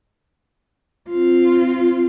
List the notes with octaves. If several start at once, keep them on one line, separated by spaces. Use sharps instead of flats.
C4 F4